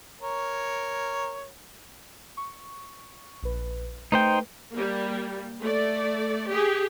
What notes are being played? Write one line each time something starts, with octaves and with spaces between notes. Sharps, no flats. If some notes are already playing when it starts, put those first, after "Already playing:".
A#4 C#5
C#6
A#1 B4
A3 D#4 B4 C5 G5
G3 A#3
A3 D5
G4 G#4